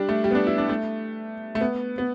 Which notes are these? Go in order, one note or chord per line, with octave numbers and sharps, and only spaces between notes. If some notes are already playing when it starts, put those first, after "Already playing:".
Already playing: G3 D4
A3
G3
B3
D4
E4
D4
A3
A3
B3
B3